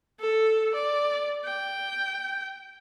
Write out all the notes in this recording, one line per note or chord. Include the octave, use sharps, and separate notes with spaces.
A4
D5
G5